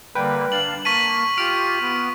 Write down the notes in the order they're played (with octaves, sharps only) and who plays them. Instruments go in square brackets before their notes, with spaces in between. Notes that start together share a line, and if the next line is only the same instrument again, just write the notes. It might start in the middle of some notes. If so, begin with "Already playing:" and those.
[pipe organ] D3 G3 A#3 [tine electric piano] B4 G5
[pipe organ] D4 F5 A5 [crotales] F#7
[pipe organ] A#3 [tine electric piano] A5 [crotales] C#6 B6 D#7
[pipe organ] F4 G4 [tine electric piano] F6 [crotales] D7
[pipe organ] B3